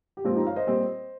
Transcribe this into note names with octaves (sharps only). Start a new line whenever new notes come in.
G4
A#2 F3 G#3 C4 F4
D#4 G4
C#5 F5
C5 D#5
A#2 G3 C4